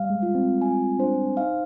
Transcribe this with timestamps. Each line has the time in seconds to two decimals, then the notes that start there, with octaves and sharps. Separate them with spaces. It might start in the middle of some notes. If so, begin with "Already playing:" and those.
Already playing: G3 F5
0.10 G#3
0.23 F4
0.35 C4
0.62 G#5
0.99 D4 C5
1.37 D#4 F5